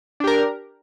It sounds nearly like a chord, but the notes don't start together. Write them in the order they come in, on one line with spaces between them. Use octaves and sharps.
D4 G4 A#4